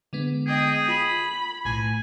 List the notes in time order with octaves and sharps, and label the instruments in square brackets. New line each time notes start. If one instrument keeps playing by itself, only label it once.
[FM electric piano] D3 G#3 B3
[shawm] G#4 [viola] D#5 G5
[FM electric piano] F4 [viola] B5
[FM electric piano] B1 A2 [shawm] G#5